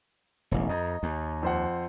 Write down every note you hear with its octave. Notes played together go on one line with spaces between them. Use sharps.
E1 A1
F2 D#5 A#5
D#2
F2 C5 F#5